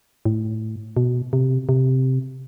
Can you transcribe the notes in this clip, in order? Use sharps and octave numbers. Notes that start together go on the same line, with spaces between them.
A2
B2
C3
C3